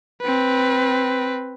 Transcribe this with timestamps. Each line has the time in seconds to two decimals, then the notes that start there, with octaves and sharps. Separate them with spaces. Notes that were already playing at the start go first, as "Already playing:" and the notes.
0.21 C4 B4